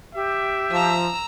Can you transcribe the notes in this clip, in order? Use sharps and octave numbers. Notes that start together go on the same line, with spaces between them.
G4 E5
F3 A#5 E6